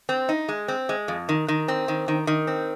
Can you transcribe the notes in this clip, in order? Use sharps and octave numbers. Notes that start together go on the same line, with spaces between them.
C4
D#4
G#3
C4
G#3
F2
D#3
D#3
C4
D#3
D#3
D#3
C4